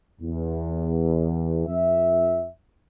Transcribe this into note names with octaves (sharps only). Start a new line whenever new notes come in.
E2
F2 E5